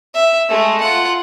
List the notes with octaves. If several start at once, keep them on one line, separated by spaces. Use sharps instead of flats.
E5
G#3 A3
F4 F#5